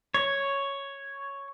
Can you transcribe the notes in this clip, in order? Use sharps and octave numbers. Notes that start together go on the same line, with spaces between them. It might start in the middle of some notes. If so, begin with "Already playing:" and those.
C#5